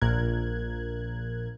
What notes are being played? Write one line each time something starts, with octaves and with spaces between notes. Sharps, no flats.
A#1 A#2 A#4 F#6 G#6